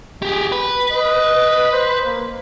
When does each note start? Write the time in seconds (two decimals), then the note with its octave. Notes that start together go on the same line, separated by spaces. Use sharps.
0.22 G4 G#4
0.52 B4
0.92 D#5
1.72 C5
2.06 A#3